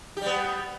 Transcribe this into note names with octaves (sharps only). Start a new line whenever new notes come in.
G3 B3 G4